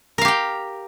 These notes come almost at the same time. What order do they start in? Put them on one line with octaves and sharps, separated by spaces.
A#4 F5 G4 G5